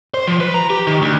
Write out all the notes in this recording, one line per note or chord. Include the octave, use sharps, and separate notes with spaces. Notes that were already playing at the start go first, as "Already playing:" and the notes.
C5
F3
B4
A#5
G4
D#3
D2